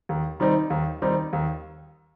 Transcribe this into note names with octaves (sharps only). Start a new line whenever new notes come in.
D#2
D#3 G3 C4 D#4
D#2
D#3 G3 C4 D#4
D#2